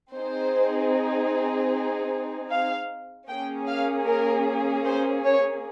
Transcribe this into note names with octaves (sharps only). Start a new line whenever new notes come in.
C4 D#4 G#4 C5
F5
A#3 C#4 G#4 G5
F5
A#4
C5
C#5